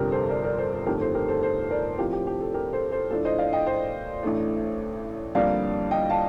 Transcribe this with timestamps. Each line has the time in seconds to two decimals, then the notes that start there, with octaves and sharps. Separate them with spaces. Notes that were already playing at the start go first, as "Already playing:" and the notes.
Already playing: G1 F2 C3 G3 D4 G4 A#4
0.12 A4 C5
0.30 A#4 D5
0.44 A#4 D5
0.58 A4 C5
0.73 A4
0.86 G1 F2 D#3 A3 G4 A#4
1.01 A4 C5
1.14 G4 A#4
1.28 A4 C5
1.43 A4 C5
1.71 A#4 D5
1.98 A2 F3 C4 G4 A#4
2.12 G4
2.27 G4
2.41 A4
2.54 G4 A#4
2.73 A4 C5
2.92 A4 C5
3.11 A2 F3 A3 D4 A4
3.25 C5 D#5
3.38 D5 F5
3.53 D#5 G5
3.66 C5 D#5
4.23 A1 A2 A3 D4
5.35 F2 D3 G3 A#3 D4 D5 F5
5.91 D#5 G5
6.10 F5 A5